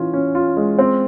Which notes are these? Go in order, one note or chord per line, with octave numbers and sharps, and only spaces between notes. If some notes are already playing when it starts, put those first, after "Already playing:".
Already playing: E3 C#4 F4
C#4
F4
G#3
C4